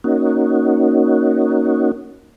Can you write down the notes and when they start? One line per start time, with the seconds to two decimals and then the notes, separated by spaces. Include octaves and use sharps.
0.04 A#3 C#4 D#4 F#4